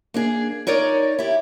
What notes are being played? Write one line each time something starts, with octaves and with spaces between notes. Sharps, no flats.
A#3 D4 G#4
D#4 A#4 C#5 D5
E4 G4